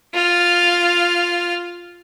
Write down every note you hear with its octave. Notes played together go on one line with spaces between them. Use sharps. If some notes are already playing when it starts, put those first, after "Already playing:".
F4 F6